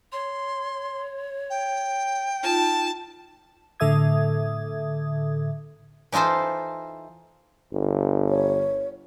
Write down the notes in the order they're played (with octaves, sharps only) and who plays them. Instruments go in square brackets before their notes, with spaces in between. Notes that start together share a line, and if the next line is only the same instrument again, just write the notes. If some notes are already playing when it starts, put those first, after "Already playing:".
[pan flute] C#5 [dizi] C6
[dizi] G5
[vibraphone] D#4 F4 [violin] A5
[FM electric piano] A2 D3 A4 E5 D#6 G#6
[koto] E3 D#4 F4 A4 C5
[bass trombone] G1
[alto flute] C#5